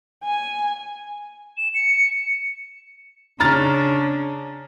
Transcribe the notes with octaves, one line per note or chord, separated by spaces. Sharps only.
G#5
E7
C#7
C#3 D4 A#5 F6 A6